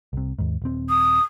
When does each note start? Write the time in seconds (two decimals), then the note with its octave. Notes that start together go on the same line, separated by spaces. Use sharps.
0.13 C2 C3
0.39 D#2 G#2
0.62 D#1 C4
0.89 D#6